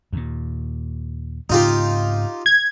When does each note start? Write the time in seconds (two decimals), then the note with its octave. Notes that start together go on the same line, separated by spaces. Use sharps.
0.13 D#2 A#2
1.50 G#2 C#3 C4 D#4 F4 G4
2.46 G#6